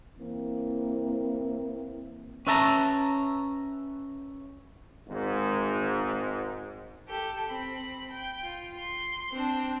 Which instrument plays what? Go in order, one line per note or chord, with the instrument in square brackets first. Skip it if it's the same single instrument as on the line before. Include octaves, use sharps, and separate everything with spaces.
[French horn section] E3 A#3 C4 E4
[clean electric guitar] C#4 B4 E5 A5 A#5
[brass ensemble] G#1 G#2
[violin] G4 A4
C4 B5
G5
F4
C6
C4 D4